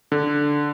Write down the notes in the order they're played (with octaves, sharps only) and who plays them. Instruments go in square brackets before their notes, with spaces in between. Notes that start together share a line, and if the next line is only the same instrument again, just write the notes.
[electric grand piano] D3